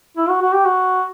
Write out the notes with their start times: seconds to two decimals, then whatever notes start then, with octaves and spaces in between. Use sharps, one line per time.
0.17 E4
0.29 F#4
0.41 F#4
0.53 G4
0.66 F#4